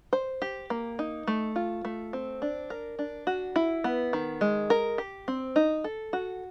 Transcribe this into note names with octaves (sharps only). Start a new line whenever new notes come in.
C5
G4
A#3
D#4
A3
F4
A3
C4
D4
A#4
D4
F#4
E4
B3
D#3
G#3
A#4
G4
C4
D#4
A4
F#4